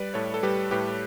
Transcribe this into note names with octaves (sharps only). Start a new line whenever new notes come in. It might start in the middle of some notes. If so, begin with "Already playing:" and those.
Already playing: G3 B4 D5
A2 A4 C#5
A4
G3 G4 B4
A2 G4 B4